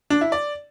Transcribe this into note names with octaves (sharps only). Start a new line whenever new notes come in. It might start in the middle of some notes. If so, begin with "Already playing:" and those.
D4
E4
D5